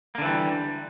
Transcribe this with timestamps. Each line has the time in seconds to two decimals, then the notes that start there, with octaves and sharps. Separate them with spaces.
0.15 A#3
0.18 D3
0.22 E3
0.25 G3